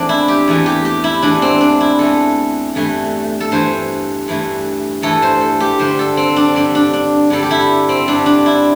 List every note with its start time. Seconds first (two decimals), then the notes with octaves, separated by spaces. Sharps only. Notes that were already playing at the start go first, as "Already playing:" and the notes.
Already playing: E2 E3 A3 C4 D4
0.09 E4
0.28 G4
0.48 E2 E3 A3
0.66 G4
0.85 G4
1.04 E4
1.23 E2 E3 A3 D4
1.42 C4
1.61 D4
1.81 E4
1.99 E2 E3 A3 A4
2.75 G2 E3 A3
3.40 A4
3.52 G2 E3 A3 C5
4.28 G2 E3 A3
5.02 G2 E3 A3 A4
5.22 C5
5.41 A4
5.60 G4
5.79 G2 D3 G3 C5
5.99 A4
6.17 C4
6.36 D4
6.54 G2 D3 G3 D4
6.75 D4
6.93 D4
7.30 G2 D3 G3 A4
7.43 G4
7.51 E4
7.89 C4
8.07 G2 D3 G3 D4
8.26 D4
8.46 E4